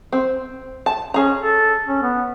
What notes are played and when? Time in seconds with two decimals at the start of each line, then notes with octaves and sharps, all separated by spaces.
0.12 C4
0.86 A5
1.14 C#4 G#4 A#5
1.40 A4
1.87 C#4
2.03 B3